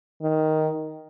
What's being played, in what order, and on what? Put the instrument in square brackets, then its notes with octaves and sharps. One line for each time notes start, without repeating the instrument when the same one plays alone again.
[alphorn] D#3